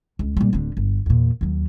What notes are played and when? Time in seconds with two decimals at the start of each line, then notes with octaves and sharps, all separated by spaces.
0.19 C#2
0.37 A#2 G3
0.53 D1 D3
0.77 G1
1.06 E2 A#2
1.41 D#2 F#3